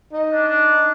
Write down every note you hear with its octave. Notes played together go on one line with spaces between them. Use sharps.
D#4
D4
D4